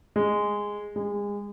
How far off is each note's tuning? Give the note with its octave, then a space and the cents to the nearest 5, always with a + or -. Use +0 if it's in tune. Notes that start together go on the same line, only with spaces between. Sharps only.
G#3 -10
G#3 -30